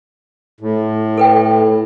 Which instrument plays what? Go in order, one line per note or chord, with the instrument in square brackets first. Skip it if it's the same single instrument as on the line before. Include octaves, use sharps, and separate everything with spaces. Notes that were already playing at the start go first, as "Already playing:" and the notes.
[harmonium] A2
[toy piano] A4 B4 G5